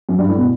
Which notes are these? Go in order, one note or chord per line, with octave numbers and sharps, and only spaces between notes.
F#2
G2
A2
B2